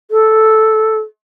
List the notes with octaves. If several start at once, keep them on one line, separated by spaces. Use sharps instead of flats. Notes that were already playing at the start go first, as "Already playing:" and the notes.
A4